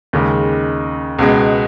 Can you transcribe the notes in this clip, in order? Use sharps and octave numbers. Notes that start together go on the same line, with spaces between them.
D#2 C#3 G#3
C#2 B2 G#3